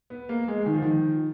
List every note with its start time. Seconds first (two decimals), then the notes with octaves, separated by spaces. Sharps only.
0.10 B3
0.29 A#3
0.48 G#3
0.66 D#3
0.74 F3
0.82 D#3